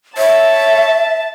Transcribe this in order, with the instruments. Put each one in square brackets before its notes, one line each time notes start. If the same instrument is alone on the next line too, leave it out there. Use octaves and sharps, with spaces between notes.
[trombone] C#5 [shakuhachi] E5 [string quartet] A5